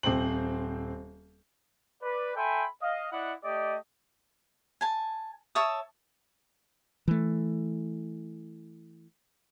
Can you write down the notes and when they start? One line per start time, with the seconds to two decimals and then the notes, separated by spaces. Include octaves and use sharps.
0.03 D#1 C4 C5 F#7
2.03 B4 D5
2.36 A4 E5 G5 G#5 B5 C6
2.82 D#5 F5
3.11 E4 D5 D#5 F#5
3.44 A3 G4 D5 D#5
4.81 G#5 A5
5.55 C#5 E5 A5 D#6
7.08 E3 A3